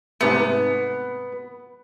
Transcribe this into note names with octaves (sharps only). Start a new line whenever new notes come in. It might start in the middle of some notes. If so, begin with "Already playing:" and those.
G#2 C3 A3 B3